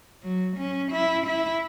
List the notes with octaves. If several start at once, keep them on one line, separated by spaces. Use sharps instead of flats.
F#3
C#4
E4
E4